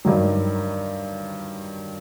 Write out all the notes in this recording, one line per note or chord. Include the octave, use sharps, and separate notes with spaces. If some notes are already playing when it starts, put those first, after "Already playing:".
G2 D#3 F#3